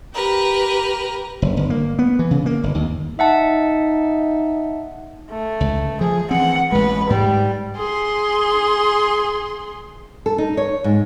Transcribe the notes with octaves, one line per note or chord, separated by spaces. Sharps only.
G4 A#4 B4
F#1
G1
A#3
B3
E3
C#3
A#3
G1
D#2
D#4 E5 F#5 A5
A3
C#2
F3 G#4
E3 C4 F#5
A1 G#3 B4
G#2 G3
G#4 C6
A4
D#4
C#5
G#2